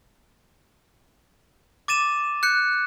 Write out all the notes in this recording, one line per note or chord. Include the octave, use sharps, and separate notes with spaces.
D6 A6 D#7 E7
F#6 G6 C#7